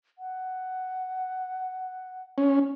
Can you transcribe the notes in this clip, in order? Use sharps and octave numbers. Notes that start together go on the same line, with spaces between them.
F#5
C#4